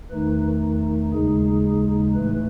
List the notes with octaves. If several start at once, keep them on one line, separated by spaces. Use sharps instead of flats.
E2 D#3 A3 D#4 B4
D#2 C#3 G#3 D#4 G#4
A2 E3 A3 B4